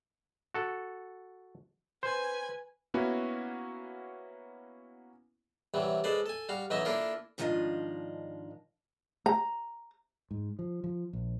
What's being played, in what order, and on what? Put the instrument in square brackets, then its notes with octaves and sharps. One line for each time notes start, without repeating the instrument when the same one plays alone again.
[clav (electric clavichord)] F#4 A4
[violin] B4 G#5 [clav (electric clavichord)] C5
[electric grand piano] A#3 B3 C#4 E4 F#4
[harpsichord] C3 E3 F#3 G3
G#3 A4 B4 C5 D5
A4 G#5
G3 F#4 F5
B1 E3 F#3 D#4 D#5 E5
A#3 D4 E4 F4 A4 A#4
[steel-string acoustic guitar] G#2 D#3 F3 D4 D#5 F5
[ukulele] A#5
[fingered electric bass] G#2
F3
F3
A#1